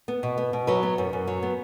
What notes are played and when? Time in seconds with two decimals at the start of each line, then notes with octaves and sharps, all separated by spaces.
0.08 B3
0.23 B2
0.38 B3
0.53 B2
0.67 F#3 B4
0.83 B3
0.98 F#2
1.13 F#2
1.27 F#3
1.43 B3